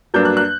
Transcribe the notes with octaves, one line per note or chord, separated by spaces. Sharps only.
G2 F#3 A#3 D4 G6
F#6
F#6